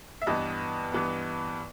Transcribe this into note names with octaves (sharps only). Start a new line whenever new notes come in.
E5
G2 E3 B3 D#5
G2 E3 B3